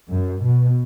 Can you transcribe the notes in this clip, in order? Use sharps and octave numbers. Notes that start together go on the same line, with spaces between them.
F#2
B2